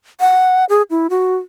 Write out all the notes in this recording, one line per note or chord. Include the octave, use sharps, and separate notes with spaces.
F#5
G#4
E4
F#4